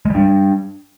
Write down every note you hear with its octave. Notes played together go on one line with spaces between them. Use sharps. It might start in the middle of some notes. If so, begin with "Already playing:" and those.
G3 G#3 D4